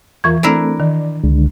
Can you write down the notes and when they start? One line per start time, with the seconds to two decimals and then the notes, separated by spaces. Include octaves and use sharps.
0.24 E2 E3 F4 A#4 C#6 G#6
0.43 A3 C4 D4 E4 A4 A#4
0.80 D#3 D5
1.24 C#2 D3 G#3 D4